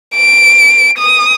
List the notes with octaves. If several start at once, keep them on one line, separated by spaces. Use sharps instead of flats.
D7
D#6